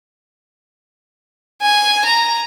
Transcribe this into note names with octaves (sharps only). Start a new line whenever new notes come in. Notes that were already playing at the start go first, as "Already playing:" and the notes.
G#5
A#5